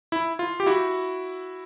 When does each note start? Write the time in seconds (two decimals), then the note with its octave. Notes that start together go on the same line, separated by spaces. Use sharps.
0.12 E4
0.39 F4
0.60 G4
0.66 E4 F#4